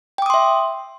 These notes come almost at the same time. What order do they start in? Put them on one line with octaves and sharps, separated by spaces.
G5 D6 D#6 C6 E5